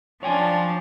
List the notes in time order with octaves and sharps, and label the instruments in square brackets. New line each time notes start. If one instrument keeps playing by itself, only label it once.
[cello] F3 D4 [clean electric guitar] C#5 G5 G#5